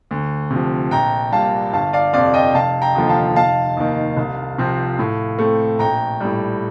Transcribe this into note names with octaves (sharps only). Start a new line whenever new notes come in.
D2
C3
F3
A#1 G5 A#5
A#2 G3 F5 A5
G1 F5 A5
D5 F5
F2 C3 D5 F5
D#5 G5
F1 F5 A5
G5 A#5
D#2 D3 F3
F5 A5
F1 F5 A5
D#2 D#3
C2
C3 F3 C4
A2
A3 C4
A#1 G5 A#5
A2 G3